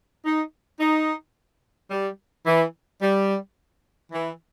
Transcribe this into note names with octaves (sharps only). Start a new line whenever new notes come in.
D#4
D#4
G3
E3
G3
E3